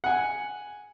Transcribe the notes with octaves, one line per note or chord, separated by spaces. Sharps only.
F#5 G#5